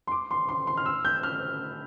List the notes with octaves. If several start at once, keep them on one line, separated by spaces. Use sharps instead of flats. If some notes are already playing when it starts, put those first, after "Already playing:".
C6
D6
C6
C6
C6
F6
E6
G6
F6